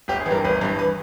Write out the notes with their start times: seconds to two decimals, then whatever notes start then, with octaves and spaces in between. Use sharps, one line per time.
0.08 G1 G4
0.20 G#4
0.26 E3
0.31 G2 A#4
0.44 G1 B4
0.61 G2 E3
0.79 B4